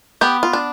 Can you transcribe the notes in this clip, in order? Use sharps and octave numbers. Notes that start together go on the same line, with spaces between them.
B3 G4
F4
D4